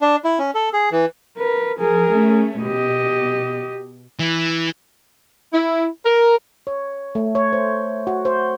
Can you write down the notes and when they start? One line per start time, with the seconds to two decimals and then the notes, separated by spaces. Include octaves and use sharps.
0.01 D4
0.24 E4
0.39 C#4
0.55 A4
0.73 G#4
0.92 E3
1.38 A#4 B4
1.79 F3 G#4 A#4
2.11 A3 C#4
2.62 B2 G4 D#5
4.19 E3
5.52 E4
6.04 A#4
6.67 C#5
7.15 A3
7.35 C#5
7.53 C5
8.07 F#4
8.25 C5